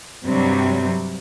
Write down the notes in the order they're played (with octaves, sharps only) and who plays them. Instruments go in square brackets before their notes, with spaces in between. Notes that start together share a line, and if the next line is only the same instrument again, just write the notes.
[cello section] G2 C3 F#3 G3